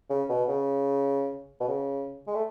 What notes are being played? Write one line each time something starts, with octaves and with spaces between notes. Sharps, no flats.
C#3
B2
C#3
B2
C#3
G#3
A3